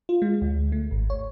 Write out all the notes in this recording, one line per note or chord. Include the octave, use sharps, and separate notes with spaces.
F4
G#3
D2
A3
G#1
C#5